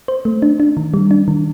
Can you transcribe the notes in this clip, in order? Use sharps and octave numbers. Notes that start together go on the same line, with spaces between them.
C5
A3
D4
D4
D#3
G3
D4
D#3